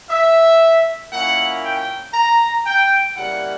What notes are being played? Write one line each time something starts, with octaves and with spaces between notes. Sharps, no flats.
E5
A#2 A#3 C#4 E4 F#5
G5
A#5
G5
C#3 G3 A#3 E4 F#5